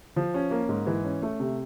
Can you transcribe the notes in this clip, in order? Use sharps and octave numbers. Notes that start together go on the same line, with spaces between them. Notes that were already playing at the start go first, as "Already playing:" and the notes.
F3
C#4
A#3
G#2
E3
C#4
A3
C3